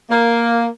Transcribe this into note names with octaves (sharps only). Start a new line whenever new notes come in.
A#3